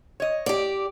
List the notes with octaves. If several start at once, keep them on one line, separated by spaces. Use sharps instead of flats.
C#5 D#5
G4 D5